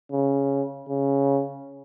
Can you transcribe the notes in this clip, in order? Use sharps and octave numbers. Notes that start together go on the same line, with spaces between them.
C#3
C#3